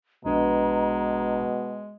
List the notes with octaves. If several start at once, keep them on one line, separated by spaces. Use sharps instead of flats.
A#1 B2 G#3 D4 B4 A#5